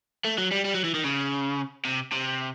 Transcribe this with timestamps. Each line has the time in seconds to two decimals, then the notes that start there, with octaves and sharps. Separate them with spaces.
0.25 A3
0.38 F#3
0.51 G3
0.65 G3
0.74 F#3
0.84 E3
0.94 D#3
1.04 C#3
1.85 C3
2.12 C3